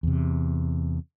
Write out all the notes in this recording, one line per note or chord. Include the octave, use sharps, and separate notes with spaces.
E2 C3